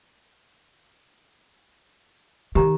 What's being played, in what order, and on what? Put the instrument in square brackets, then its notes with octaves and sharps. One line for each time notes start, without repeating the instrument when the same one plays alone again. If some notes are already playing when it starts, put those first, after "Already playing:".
[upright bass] D#3 [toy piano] G4 A#5